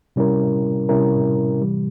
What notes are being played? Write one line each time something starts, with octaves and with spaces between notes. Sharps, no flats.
C3 G3 C#4 E4 A#4
C3 G3 C#4 E4 A#4
C3 E3 G3